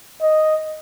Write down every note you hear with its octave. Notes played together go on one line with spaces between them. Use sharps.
D#5